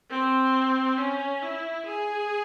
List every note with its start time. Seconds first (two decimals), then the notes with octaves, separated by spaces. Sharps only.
0.10 C4
0.98 C#4
1.42 E4
1.86 G#4